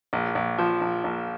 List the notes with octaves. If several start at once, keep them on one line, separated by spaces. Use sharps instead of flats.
A#1
A#1
F3
A#1
A#1